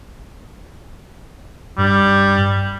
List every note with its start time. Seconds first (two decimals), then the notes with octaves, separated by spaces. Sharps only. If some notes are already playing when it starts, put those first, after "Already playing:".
1.78 G2 G3